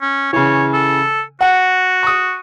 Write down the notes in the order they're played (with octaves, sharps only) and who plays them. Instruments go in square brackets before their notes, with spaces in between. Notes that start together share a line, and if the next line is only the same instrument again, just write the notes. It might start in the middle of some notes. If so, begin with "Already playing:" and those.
[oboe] C#4
[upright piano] C#3 E3 [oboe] C#5
[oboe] A4
[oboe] F#4 [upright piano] F#5
[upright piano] C#6 D#6